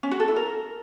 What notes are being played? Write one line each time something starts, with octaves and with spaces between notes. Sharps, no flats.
C#4
F#4
A4
E4
A#4